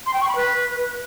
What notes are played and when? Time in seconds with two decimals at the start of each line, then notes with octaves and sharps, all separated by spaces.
0.06 C6
0.14 G5
0.21 C#6
0.28 B5
0.36 B4